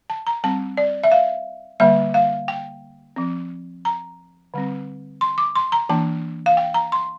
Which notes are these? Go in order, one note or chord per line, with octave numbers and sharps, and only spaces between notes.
A5
A#5
G3 C4 A5
D5
E5
F5
D3 G3 A#3 E5
F5
G5
F3 C4
A#5
D3 G3 C4
C6
D6
C6
A#5
E3 A#3 D4 A5
F5
G5
A#5
C6